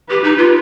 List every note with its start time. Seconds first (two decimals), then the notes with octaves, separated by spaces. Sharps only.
0.10 G4 B4
0.24 D#4
0.38 F4